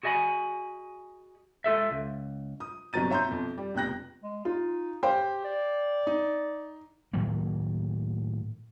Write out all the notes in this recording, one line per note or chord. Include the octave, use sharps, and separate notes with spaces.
F#4 G#4 D#5 G#5 B5
G#3 F4 A4 E5
C#2
D#6
G1 C3 F#3 A#5 A6 D#7
C#5 E5 A#5 C6 G6
F2 B2
G3
F1 B2 G5 F#6 A#6
G#3
D#4 F4
G4 C5 F5 G5
D5
D#4
A2 D#3 F#3 A#3